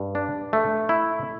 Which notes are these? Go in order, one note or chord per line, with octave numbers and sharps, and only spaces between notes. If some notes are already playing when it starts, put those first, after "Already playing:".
Already playing: G2
D4
A3
E4